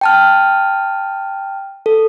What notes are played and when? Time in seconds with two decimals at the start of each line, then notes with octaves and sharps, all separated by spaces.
0.01 G5 A5 F6
1.86 A4